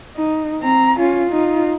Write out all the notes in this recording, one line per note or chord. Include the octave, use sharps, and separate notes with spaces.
D#4
C4 A#5
C#4 F4
D#4 F4